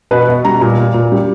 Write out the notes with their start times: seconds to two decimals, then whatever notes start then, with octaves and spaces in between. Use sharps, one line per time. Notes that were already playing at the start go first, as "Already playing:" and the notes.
0.11 B2 B4
0.28 B2
0.45 G3 A#5
0.61 A#2
0.78 A#2
0.94 A#2
1.12 G3